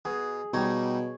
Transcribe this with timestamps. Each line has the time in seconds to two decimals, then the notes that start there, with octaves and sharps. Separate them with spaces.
0.05 B2 G#4
0.54 B2 G3 D#4 C#5